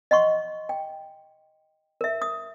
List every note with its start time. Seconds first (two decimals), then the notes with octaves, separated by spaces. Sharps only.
0.11 D#5 F#5 C6 C#6
0.69 G5
2.01 A#4 E5
2.22 D#6